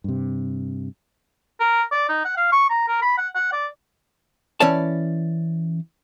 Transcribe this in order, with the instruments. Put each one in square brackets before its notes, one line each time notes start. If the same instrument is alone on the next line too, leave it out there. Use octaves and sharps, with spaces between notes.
[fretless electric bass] G2 C3
[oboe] A#4
D5
D#4
F#5
F5
C#6
A#5
A#4
B5
F#5
F#5
D5
[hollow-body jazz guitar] E3 C#4 C#5 D5 A5